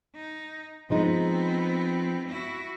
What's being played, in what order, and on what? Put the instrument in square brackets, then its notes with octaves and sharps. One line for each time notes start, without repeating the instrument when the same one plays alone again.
[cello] D#4
[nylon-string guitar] F3 G#3 D#4 [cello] B3 C4
[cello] E4 F#4